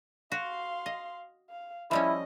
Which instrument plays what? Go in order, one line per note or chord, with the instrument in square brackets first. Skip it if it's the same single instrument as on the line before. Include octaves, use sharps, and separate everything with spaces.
[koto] F#4 [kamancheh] F5 C6
[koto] D#5
[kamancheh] F5
[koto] F3 G3 C#4 [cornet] E4 [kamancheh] D#5